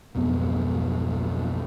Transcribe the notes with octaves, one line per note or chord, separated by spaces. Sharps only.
B1 F2 G#2 B3